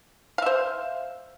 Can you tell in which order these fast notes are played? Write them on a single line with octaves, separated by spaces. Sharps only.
F5 E5 C5